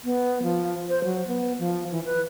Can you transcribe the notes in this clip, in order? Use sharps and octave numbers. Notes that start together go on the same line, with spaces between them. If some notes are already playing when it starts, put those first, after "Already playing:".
B3
F3
C5
F#3
B3
F3
E3
B4